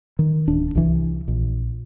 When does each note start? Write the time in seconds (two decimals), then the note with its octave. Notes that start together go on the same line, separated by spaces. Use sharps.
0.19 D#3
0.48 D1 D4
0.75 C2 E3
1.28 A#1